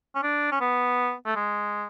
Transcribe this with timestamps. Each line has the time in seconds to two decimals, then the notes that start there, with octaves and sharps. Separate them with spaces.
0.15 C#4
0.23 D4
0.52 C#4
0.61 B3
1.26 A3
1.36 G#3